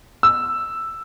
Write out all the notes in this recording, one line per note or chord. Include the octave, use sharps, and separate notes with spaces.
E6